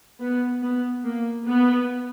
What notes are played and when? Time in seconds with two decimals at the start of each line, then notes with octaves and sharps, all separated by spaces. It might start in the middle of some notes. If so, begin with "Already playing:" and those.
0.21 B3
0.63 B3
1.04 A#3
1.47 B3